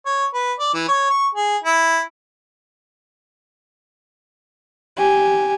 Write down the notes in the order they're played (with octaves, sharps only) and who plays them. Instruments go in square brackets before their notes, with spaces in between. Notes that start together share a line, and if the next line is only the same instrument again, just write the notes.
[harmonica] C#5
B4
D5
E3
C#5
C#6
G#4
E4
[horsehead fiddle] G4 G#5